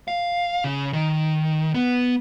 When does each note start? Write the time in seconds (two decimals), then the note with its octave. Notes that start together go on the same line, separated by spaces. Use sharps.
0.08 F5
0.64 C#3
0.93 D#3
1.74 B3